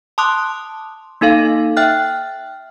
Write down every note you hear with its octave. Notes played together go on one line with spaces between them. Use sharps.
A5 C6 D6 D#6 F#6
A#3 D#4 A4 F5
E5 G5 F6 F#6